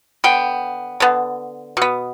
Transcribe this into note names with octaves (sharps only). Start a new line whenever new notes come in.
D3 B3 G5
D3 B3
B2 B3